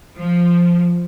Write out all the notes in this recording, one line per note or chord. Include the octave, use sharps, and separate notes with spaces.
F3